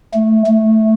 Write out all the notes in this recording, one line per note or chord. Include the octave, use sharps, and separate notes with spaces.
A3
A3